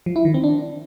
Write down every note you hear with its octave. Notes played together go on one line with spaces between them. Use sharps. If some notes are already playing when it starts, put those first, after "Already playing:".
F3
E4
D#3
C4
D4